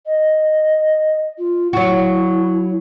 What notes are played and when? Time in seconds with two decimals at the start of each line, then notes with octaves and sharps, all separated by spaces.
0.06 D#5
1.38 F4
1.73 F#3 E4 F#4